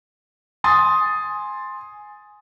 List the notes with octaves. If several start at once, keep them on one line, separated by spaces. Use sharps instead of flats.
G#5 C6 D#6 A6